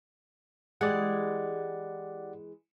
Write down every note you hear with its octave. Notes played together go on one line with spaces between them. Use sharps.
E3 G#3 G4 G#4 D5 F#5